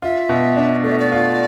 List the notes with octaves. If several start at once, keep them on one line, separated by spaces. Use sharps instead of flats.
F4 E5
B2
D4
A3 D5
E5
D5
F4